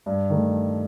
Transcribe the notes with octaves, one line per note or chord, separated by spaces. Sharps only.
G2
D#3 A3